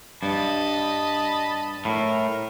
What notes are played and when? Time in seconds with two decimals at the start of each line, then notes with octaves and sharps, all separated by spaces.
0.23 G2 D#5 A5 B5
1.85 A2 A#4